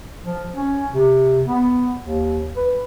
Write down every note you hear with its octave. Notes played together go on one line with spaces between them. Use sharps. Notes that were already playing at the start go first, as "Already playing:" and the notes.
F3
C#4
C3
B3
D#2
B4